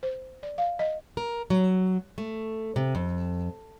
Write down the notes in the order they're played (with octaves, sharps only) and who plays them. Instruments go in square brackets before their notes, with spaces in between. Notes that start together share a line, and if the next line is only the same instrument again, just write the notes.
[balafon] C5
D5
F5
D#5
[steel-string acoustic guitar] A#4
F#3
A3
C3
F2